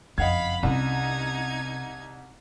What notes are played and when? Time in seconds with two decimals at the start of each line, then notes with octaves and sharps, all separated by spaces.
0.18 F#1 F2 D#5 F5 F#5 B5 G#6
0.63 C2 C3 C#4 D#4 G#6